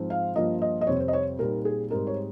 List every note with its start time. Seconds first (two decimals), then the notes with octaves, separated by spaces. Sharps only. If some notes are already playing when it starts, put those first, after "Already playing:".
Already playing: G#2 F3 C4 F4
0.10 F5
0.35 G2 F3 A#3 F4 D#5
0.62 D#5
0.81 D#5
0.87 F2 C3 G3 C4 C#5
1.00 C5
1.08 D#5
1.13 C#5
1.39 A#2 G3 C4 D#4 A#4
1.65 G#4
1.90 G#2 G3 C4 D#4 A#4
2.07 C#5